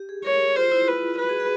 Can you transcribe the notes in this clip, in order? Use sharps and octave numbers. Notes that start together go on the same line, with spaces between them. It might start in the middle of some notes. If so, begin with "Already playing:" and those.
Already playing: G4
G#4
A#4 C#5
G#4
F4 C5
E4
F4 B4
F#4 B4
G#4
G#4